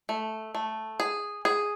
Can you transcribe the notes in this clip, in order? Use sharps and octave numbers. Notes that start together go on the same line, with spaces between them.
A3
A3
G#4
G#4